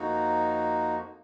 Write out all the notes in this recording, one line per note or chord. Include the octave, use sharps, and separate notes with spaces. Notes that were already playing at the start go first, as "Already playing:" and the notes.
Already playing: F2 F3 A#3 D#4 F#4